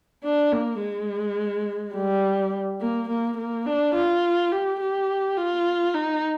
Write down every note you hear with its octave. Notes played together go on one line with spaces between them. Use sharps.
D4
A#3
G#3
G3
A#3
A#3
A#3
D4
F4
G4
G4
F4
D#4